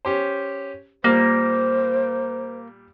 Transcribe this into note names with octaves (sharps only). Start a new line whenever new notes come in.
C#4 G4 C5
A#2 G3 A#3 C5